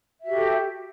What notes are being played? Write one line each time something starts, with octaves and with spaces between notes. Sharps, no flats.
F#4 G4 A4 E5